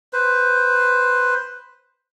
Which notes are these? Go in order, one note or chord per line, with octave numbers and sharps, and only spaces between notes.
B4 C5